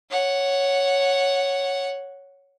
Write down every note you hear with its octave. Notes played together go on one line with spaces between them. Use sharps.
C#5 F#5